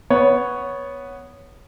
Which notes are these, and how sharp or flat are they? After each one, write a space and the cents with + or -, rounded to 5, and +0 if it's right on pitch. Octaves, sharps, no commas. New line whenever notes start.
B3 +0 C#5 +0